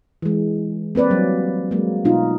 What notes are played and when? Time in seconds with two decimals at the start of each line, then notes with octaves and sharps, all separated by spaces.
0.22 E3 G#3
0.95 A#3 C4 B4 D5
1.10 F#3 G3
1.71 F#3 G#3 A#3
2.05 B2 B3 D#4 F4